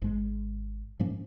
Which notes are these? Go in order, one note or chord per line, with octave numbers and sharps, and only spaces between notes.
G#1 G#2 G#3
G#2 F3 A#3 C#4